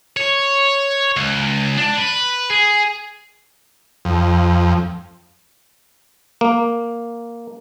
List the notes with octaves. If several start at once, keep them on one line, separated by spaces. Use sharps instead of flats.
C#5
C#2
D4
B4
G#4
F2
A#3